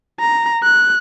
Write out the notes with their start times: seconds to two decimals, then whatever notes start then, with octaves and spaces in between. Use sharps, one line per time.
0.20 A#5
0.63 F#6